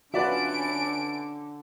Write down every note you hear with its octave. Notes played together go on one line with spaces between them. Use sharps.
D3 C#4 F4 F#4 B4 D5 E5 D7